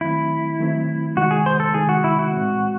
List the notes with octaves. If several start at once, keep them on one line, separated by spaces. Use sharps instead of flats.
D#3 F#3 A3 C4 E4
D#3 F#3 A3 C4
C3 D#3 G#3 D#4 F#4
G#4
C5
A4
C3 D#3 G#3 D#4 G#4
F#4
E4
F#4
A2 E3 G#3 C4